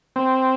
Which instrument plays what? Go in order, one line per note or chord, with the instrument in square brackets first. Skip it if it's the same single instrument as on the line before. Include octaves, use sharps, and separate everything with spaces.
[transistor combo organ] C4